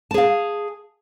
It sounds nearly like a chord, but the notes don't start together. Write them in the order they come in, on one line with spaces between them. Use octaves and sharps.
A5 G#4 F5